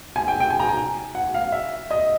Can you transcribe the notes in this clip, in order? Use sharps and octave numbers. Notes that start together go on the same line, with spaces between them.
G#5
G5
G5
G#5
A#5
G#5
F#5
F5
E5
D#5